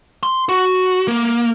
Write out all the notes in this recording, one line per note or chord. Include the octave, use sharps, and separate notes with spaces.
C6
F#4
A#3